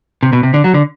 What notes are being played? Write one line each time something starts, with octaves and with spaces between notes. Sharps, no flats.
C3
B2
C3
D3
F#3
D3